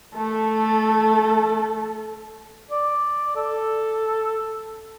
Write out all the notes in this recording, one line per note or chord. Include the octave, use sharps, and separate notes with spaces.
A3 A4
D5
A4